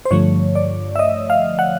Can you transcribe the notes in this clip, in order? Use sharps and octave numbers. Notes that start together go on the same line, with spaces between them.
C5
G2 D3 F3 A3 C#5
D5
E5
D#5
F5
F#5